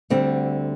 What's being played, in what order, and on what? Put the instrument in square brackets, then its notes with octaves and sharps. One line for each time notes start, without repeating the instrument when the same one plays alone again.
[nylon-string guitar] D2 D3 G3 C4